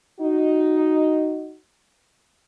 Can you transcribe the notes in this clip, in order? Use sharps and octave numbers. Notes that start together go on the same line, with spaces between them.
D#4 F#4